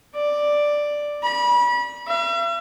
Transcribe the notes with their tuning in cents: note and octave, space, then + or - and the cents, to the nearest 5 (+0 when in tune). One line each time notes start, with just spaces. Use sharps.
D5 +5
B5 -30
E5 +45